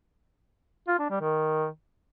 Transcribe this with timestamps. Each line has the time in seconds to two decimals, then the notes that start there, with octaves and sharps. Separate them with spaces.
0.88 F4
0.99 D4
1.10 G3
1.21 D#3